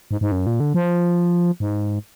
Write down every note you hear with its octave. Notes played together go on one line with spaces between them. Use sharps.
G#2
G#2
F#2
A#2
D3
F3
G#2